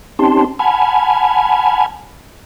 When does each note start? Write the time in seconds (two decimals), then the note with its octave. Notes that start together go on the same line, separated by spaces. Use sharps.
0.19 C4 C#4 D#4 G4 A5 C6
0.59 F#5 G#5 A5 B5 F6 G#6